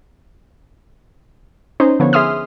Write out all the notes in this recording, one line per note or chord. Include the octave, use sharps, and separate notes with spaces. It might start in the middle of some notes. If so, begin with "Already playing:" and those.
C#4 D#4 C5
D3 F3 B3 C#5
G#4 E5 C6 D#6 F6